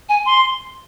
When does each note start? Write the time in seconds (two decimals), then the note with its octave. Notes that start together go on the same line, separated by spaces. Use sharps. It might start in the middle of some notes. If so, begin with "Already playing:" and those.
0.09 G#5
0.26 C6